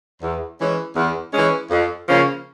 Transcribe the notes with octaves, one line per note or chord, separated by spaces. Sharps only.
E2
E3 G#3 C#4
E2
E3 G#3 C#4
F2
C#3 F3 A#3 C#4